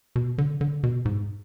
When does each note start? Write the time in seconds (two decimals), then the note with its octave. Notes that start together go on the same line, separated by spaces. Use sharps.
0.16 B2
0.38 D3
0.61 D3
0.83 B2
1.05 G#2